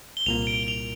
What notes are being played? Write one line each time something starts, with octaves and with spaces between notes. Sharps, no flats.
G7
C2 A#2 A#3 F7
F7
D7
G7
F7